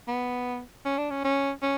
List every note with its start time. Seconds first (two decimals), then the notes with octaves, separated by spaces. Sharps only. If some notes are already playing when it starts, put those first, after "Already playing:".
0.08 B3
0.85 C#4
0.98 D4
1.10 C#4
1.24 C#4
1.62 C#4